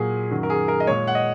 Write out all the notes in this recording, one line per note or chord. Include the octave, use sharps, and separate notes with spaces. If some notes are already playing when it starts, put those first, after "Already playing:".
Already playing: A#2 F#3 G#4
F#2 D#3 F#3
A#4
G#4
A#4
D#5
A#2 G#3 C#5
F#5
D#5